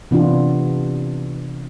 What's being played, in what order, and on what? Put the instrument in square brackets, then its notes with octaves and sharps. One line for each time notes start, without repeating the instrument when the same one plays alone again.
[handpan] C3 E3 B3 D4 F4